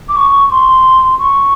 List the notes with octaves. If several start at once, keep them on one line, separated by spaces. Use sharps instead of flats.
D6
C#6
C6
C#6